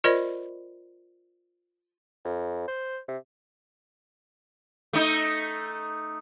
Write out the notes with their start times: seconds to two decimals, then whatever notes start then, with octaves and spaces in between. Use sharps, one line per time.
0.04 F4 A#4 C5 D5 D#5 B5
2.25 F2
2.68 C5
3.08 C3
4.93 A3 D#4